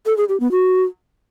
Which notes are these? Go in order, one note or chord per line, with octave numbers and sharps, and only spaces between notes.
A4
G#4
G4
B3
F#4